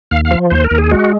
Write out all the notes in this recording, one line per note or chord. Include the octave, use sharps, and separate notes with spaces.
D#2 F5
F5
F3
D#2 C5
A#4
D#2
G#4
G#3 F#4